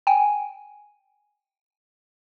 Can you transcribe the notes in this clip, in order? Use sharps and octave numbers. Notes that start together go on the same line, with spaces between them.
G5 G#5